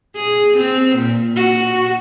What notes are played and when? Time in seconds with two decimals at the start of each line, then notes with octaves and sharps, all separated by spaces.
0.16 G#4
0.57 C4
0.96 A#2
1.36 F#4